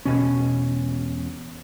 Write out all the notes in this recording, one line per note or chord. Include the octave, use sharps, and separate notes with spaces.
E1 C#2 B2 C#4